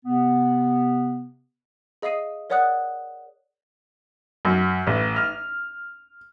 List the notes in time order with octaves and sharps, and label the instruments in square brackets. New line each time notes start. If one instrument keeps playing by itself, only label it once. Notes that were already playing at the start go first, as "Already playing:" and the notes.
[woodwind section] C3 B3
[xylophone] G#4 D#5 F5 D#6 C7 D#7
A#4 C#5 D5 F#5 D#6 F#6
[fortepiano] F#2
A1
F6